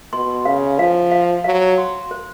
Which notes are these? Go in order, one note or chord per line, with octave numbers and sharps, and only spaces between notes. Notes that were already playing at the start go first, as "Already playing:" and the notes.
B2 C6
C#3 F5
F3 F5
F5
F#3 F5
C6
C5